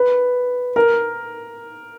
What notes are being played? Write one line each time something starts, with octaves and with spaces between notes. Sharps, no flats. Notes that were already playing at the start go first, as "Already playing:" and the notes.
Already playing: B4
A#4